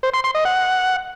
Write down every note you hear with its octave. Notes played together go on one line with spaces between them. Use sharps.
C5
C6
C6
D#5
F#5